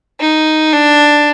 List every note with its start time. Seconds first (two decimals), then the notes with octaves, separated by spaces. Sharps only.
0.20 D#4
0.72 D4